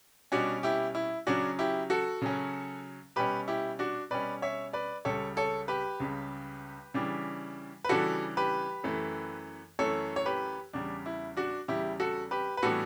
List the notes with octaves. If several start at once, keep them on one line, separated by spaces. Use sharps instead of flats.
B2 G3 C#4 D4 F#4
E4 G4
E4
C#3 F#3 C#4 D4 F#4
E4 G4
F#4 A4
C#3 F#3 C#4
B2 G3 C#4 G4 B4
E4 G4
D4 F#4
B2 G3 C#4 B4 D5
C#5 E5
B4 D5
C#2 C#3 G3 A4 C#5
A4 C#5
G4 B4
C#2 C#3 G3
C#3 E3 G3 D4
B4
C#3 E3 G3 D4 F#4 A4
G4 B4
F#2 E3 A3
F#2 E3 A3 A4 C#5
C#5
G4 B4
E2 C#3 G3 D4
E4
D4 F#4
E2 C#3 G3 E4 G4
F#4 A4
G4 B4
B4
A2 E3 G3 B3 D4 F#4 A4